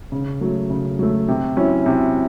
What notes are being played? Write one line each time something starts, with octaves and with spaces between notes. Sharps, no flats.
C#3
F#3 A3
C#3
F#3 A3
C3
F#3 C#4 E4
C3